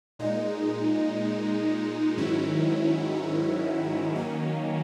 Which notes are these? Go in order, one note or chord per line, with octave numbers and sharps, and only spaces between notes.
A#2 G#3 D#4
G#2 D#3 F#3 C#4 E4
D#3 F#3 A#3 C#4